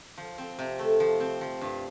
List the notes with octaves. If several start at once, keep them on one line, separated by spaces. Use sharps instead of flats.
F3
C4
C3
A3
F3
C4
F3
G2